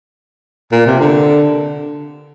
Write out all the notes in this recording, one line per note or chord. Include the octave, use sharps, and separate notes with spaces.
A#2
C3
D3